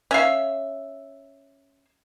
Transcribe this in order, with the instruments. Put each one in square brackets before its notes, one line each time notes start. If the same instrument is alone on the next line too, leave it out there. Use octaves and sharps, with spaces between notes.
[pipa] C#4 E5 F5